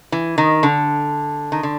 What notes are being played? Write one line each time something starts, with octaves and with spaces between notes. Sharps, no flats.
E3
D#3
D3
D#3
D3